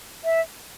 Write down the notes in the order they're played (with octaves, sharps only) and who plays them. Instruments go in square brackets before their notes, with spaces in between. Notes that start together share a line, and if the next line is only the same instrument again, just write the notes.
[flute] E5